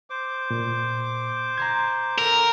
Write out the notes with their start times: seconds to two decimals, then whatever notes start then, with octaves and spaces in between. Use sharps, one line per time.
0.10 C5 D6
0.51 A#2
1.58 A#5 C6 G#6
2.18 D3 A#4 E6